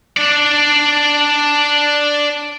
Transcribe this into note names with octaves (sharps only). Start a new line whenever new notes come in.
D4 D5